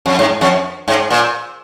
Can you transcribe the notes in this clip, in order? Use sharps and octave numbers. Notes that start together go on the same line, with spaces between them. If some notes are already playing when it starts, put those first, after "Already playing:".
F2
G#2
F2
G#2
A#2